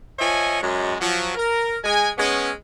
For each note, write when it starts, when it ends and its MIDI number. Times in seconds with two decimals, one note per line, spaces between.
0.18 0.59 53
0.18 0.59 73
0.18 0.59 75
0.18 0.59 76
0.18 0.59 80
0.61 0.94 42
0.61 0.94 56
0.99 1.31 53
0.99 1.31 54
1.35 1.76 70
1.83 2.09 56
1.83 2.09 80
2.16 2.50 56
2.16 2.50 59
2.16 2.50 61